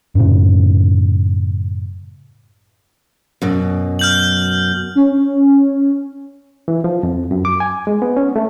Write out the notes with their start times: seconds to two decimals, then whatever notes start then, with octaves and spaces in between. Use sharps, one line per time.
0.15 F#2 A2 C#3
3.42 F#2 B2
3.99 F6 G6 F#7
4.95 C#4
6.68 E3
6.84 F3
7.03 F2
7.31 F#2
7.45 D6
7.60 G#5
7.87 G#3
8.02 B3
8.17 C#4
8.36 A3